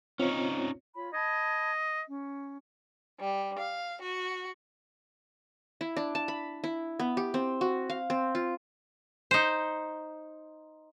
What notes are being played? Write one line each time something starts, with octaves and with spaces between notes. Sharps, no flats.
C4 C#4 D#4 F4 C#5
F4 C#5 B5
D#5 A5 B5 G#6
C#4
G3
F5
F#4
E4
D4
A5
B5
E4
B3
G4
C4
F#4
F5
C4
F4
D#4 C5